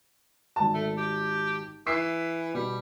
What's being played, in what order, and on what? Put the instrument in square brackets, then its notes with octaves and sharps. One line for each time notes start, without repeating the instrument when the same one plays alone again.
[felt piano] G#1 A5
[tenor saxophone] A3
G4
[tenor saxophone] E3 [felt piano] E6 B6 C7
[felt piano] B2 [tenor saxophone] G3